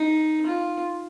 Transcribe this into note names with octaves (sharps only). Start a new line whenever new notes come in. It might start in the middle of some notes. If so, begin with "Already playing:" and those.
Already playing: D#4
F4